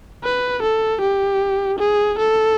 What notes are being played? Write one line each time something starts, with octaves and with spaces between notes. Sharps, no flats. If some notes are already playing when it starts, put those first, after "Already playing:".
B4
A4
G4
G#4
A4